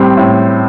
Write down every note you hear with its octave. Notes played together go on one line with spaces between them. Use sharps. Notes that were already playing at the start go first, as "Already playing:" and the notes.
Already playing: A2 G3 C4
A2